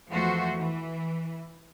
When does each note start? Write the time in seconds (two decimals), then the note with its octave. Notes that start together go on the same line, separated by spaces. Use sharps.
0.11 E2 F3 A3 F#4 C5
0.57 E3